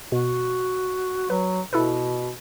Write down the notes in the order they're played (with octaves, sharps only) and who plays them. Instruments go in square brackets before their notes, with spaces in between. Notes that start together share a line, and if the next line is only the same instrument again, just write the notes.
[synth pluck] B2 [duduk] F#4
[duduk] F#3 [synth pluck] B4
[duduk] B2 [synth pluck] E4 A4 B4